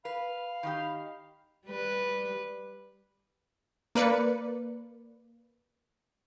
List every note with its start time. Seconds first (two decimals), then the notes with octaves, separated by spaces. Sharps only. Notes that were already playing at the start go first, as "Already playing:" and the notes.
0.05 B4 F5 B5
0.63 D#3 D#4 G4
1.67 G3 B4
3.95 A#3 B4 D5 C#7